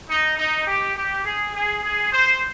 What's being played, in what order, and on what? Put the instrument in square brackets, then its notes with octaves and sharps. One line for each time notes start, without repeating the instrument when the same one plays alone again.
[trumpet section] D#4
D#4
G4
G4
G#4
G#4
G#4
C5